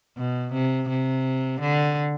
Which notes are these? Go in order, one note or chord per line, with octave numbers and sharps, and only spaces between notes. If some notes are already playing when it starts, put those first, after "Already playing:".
B2
C3
C3
D3